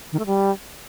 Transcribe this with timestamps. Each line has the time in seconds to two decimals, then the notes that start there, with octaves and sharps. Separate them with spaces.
0.12 D#3
0.19 A3
0.26 G3